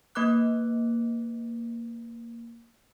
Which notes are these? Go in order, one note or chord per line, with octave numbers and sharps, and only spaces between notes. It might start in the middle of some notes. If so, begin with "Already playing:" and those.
A#3 B4 D6 F#6